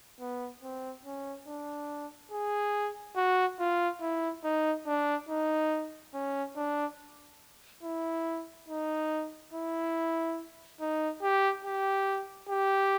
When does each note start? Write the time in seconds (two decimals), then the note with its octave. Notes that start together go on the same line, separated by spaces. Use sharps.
0.20 B3
0.63 C4
1.05 C#4
1.47 D4
2.32 G#4
3.16 F#4
3.60 F4
4.01 E4
4.44 D#4
4.86 D4
5.29 D#4
6.14 C#4
6.56 D4
7.83 E4
8.69 D#4
9.53 E4
10.80 D#4
11.22 G4
11.65 G4
12.49 G4